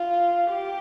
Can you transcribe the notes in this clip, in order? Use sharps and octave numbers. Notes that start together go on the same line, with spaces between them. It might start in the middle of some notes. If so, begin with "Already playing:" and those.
Already playing: F4
G4